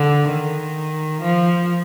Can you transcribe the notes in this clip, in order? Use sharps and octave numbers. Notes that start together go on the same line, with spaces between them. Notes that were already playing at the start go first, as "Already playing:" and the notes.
Already playing: D3
D#3
F3